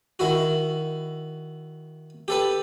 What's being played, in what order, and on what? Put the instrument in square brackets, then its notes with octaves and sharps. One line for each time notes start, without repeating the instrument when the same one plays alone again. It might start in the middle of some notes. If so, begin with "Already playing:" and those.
[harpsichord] D#3 E4 F#4
G4 A4 B4